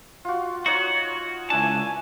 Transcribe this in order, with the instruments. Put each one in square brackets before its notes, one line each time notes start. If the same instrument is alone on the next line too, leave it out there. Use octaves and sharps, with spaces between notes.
[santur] F4 F#4
[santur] D#4 C#5 [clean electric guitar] F#4
[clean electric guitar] C#2 A5 [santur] D4 E4 [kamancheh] G#5